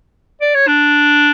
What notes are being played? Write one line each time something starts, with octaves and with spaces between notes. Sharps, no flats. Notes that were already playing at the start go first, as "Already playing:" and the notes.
D5
C#5
D4